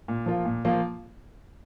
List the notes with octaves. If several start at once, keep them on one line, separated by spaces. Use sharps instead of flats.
A#2
F3 A#3 F4
A#2
F3 A#3 F4